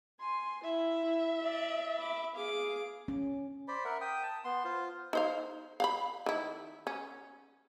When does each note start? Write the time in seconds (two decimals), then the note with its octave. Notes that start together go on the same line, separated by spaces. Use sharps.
0.21 G#5 C6
0.63 E4 E5
1.04 E4
1.43 D5
1.98 B5 D6
2.35 G#4 F5 D6
3.08 C#4
3.68 C5 D5 B5
3.85 A#4 E5 F#5
4.01 G5 D#6
4.23 A5
4.45 B3 C6
4.65 F4 C5
5.13 D#4 C5 F5
5.80 F5 F#5 B5
6.26 D#3 E4
6.87 C#4